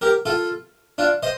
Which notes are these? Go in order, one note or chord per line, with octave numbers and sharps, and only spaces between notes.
G4 A#4
F4 A4
D4 F4
C5 D#5